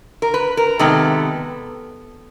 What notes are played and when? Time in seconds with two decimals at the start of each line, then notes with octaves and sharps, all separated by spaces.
0.22 A#4
0.34 B4
0.57 A#4
0.79 C3 D#3 G#3 B3 A4